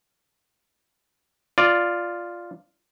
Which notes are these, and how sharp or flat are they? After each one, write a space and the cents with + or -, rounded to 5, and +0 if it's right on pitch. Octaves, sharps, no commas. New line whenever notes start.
F4 +0 D5 +0